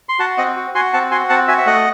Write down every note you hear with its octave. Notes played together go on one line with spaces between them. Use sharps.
C6
F#4 F#5 A5
C4 D#5 F#5
F#4
F#4 G#5 C6
C4 F#5 A5
F#4 G#5 C6
C4 F#5 A5
F#4 E5 G#5
E5
A3 D#5 F#5